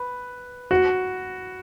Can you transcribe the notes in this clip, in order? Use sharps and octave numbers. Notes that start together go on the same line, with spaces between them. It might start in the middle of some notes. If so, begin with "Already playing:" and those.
Already playing: B4
F#4